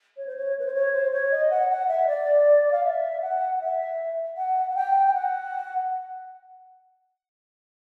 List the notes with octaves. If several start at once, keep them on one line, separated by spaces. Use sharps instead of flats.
C#5
C5
C#5
B4
C5
C#5
C5
C#5
D#5
F#5
F#5
E5
D5
F5
E5
F#5
E5
F#5
F#5
G5
G5
F#5